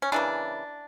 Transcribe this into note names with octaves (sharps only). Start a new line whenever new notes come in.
C#4
C#3 E3 A#3 D4